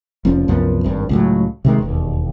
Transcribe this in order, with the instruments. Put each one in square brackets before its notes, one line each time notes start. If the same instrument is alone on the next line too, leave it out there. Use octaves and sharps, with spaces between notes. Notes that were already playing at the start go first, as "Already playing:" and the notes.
[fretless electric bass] F1 F3 C#4
C2 F#2 F3 B3
G#1 G2
C#2 A2 F#3
C3 D#3 G#3
E1 D#2